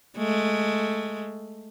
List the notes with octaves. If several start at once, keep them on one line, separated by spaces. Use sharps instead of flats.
G#3 A3